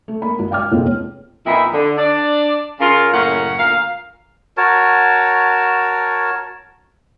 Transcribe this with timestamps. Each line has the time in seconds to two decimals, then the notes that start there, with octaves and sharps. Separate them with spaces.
0.08 A3
0.22 A#3 B5
0.39 G#1 F#4
0.51 F5 G5 D6 F6
0.72 F1 A#2 G#3 B3 C4 C#5
1.46 F2 A#2 B3 D#4 E4
1.73 D3
1.98 D4 D5
2.80 C#3 F4 A#4
3.13 F#2 A2 C#3 A#3 C#4 F#5
3.58 D2 A#2 A#4 F5
4.57 F#4 A#4 C#5 A5